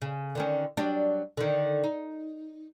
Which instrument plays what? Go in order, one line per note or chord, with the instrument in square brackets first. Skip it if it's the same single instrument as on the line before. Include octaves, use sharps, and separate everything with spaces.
[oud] C#3
D3 D#3 C#4
F#3 G3 D4
D3 D#3
D#4